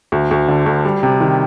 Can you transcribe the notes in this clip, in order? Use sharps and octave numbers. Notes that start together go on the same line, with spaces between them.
D2
D2
D3
D2
G3
C3
D#3